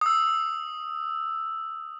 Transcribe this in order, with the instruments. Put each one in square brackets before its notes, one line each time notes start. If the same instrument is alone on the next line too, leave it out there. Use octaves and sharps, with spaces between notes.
[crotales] D#6 E6